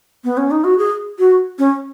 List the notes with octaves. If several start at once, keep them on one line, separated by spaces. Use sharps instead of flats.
B3
C#4
D#4
F#4
G#4
F#4
C#4